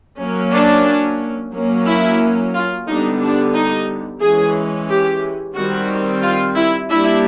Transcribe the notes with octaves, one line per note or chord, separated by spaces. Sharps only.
F#3 A#3 C#4
D4
F#3 A#3 C#4
E4
F4
D3 G3 B3 D4 D#4
D4
D#4
E3 G#3 C#4 G#4
G4
D#3 G3 C4 F#4
F4
E4
G3 A#3 D4 E4